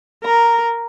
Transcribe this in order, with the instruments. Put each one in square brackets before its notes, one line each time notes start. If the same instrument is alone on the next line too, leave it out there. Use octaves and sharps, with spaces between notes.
[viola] A#4 [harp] A#5